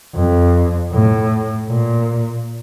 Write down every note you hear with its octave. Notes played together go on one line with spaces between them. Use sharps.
F2
A2
A#2